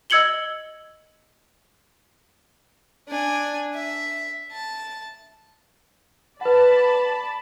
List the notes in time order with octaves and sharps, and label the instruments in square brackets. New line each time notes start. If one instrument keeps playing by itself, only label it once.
[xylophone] D#5 E6 G#6 C#7 F#7 G7
[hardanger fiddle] D4 G#5
E5
A5
[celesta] B4 F#5 [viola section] D5 A5 B5